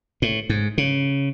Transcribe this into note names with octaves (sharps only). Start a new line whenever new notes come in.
A2
G#2
C#3